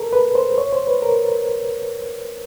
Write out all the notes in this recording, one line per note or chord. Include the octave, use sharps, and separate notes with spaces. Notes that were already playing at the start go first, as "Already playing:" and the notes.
Already playing: A4 A#4
B4
C5
C#5
C5
B4
A#4